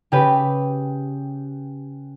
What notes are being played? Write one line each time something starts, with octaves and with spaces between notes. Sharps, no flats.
C#3 G4 B4